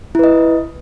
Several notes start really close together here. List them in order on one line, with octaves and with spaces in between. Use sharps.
E4 B4 D#5